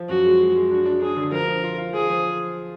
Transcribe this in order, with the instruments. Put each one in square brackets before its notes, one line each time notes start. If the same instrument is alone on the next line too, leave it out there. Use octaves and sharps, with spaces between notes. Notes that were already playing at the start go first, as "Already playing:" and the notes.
Already playing: [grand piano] F3
[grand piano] F#2 [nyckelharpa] F#4
[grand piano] G#3
G#3
G#3
[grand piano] D4 [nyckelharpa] F#4
[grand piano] D4
[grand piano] D4 [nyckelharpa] G#4
[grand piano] D3
[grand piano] F3 [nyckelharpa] A#4
[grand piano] F3
F4
F4
[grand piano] F3 [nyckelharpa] G#4
[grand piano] F3